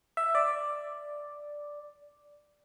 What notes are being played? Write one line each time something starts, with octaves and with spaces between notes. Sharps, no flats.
E5
D5